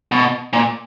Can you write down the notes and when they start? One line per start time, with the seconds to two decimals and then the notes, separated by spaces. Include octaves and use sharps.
0.12 B2
0.53 A#2